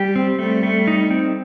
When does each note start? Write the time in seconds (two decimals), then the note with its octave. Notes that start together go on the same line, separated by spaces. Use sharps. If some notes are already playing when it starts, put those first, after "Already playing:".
Already playing: G3 G4
0.16 C4
0.39 G3 A3
0.63 A3
0.88 D#4
1.11 C4